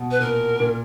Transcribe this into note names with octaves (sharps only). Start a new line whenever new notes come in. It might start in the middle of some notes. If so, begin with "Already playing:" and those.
Already playing: B2
B4
A#2 A#4
A#2